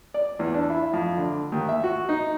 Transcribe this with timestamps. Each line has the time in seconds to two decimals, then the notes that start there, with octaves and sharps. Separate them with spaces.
0.14 D5
0.39 E2
0.54 D4
0.70 E4
0.93 F2
1.17 D3
1.52 D#2
1.69 E5
1.84 F#4
2.09 D#4